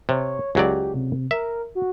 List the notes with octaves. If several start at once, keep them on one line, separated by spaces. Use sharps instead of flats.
C3 C#5
C#2 F#3 G4 D5
C3
A#4 E5
F#4